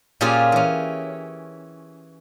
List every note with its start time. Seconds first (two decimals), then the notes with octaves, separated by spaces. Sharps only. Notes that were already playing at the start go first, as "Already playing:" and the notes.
0.21 A#2 C#4 F4 G4 G#4
0.52 E3 C#4